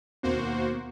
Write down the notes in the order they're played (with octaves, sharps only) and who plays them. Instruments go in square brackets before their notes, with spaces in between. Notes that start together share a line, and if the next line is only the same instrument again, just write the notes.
[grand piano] D#2 B2 [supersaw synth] A#3 F#4 C5